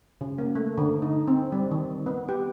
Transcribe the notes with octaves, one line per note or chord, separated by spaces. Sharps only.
C#3
A#3
A3
D3
D#4
C4
G3
D#3
B3
G4